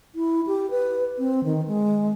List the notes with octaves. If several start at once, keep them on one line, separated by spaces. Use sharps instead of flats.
E4
G4
B4
C4
D#3
G#3